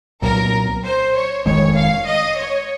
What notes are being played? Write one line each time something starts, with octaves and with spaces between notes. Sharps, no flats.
C2 A#2 F#3 A#4
C5
C#5
F1 D#2 D#3 G#3 C#5
F5
D#5
C#5